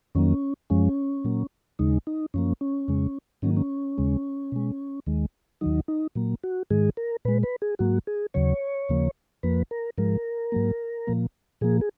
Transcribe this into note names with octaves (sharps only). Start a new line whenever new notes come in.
F2 D#3 F#3 A#3 C#4
F#2 F3 G#3 C#4
A#2 F#3 A#3
D#2 C#3 G#3 D#4
D#4
F#2 F3 A#3 C#4
C#4
F2 C#3 G#3
G#2 D#3 F#3 A#3 C#4
C#4
D#2 C#3 G#3
B2 G#3
D#2 D#3 G#3
D#2 D#3 F#3 D#4
D#4
A#2 F#3 A#3
F#4
G#2 D#3 G#3 G#4
A#4
A#2 G#3 B4
B4
G#4
G#2 F#3 A#3 F#4
G#4
D#2 C#3 F#3 C#5
D#2 C#3 F3 A#3
F2 F3 A#3 B4
A#4
G#2 F3 G#3 A#4
G#2 F#3 A#3
A#2 F3 A#3
A#2 F3 A#3 G#4
G#4